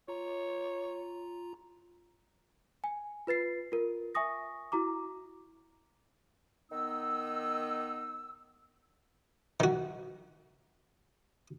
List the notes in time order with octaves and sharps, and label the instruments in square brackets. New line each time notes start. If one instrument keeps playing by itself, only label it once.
[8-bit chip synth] F4 A#5 [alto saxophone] C#5
[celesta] G#5
F4 B4 A6 C7
F4 A#4
E5 G#5 C#6 D#6 A#6
E4 F#4 A#5 D6
[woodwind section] D#3 B3 D#4 E6
[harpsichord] D#3 F#4